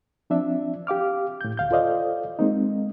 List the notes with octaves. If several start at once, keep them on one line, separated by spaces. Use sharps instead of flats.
F3 C4 D4 E5
G4 F5 D6 F6
A2 G6
D2 F5 G6
F4 A4 C5 D5 D#5 F5
G#3 A#3 C4 D#4